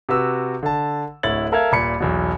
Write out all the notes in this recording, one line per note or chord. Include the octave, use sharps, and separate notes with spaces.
C3 F#4 B4 E6
D3 A5
D1 D2 E4 C#5 A6 F#7
A4 A#4 E5 F5 G#6
D#1 A#2 B5 C#7
B1 E2 B2